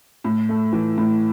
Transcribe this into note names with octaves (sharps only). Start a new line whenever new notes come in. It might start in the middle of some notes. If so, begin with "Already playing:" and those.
A2
A3
E3
A2